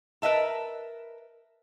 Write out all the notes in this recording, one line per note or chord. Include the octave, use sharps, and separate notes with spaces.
A#4 B4 D#5 E5 A5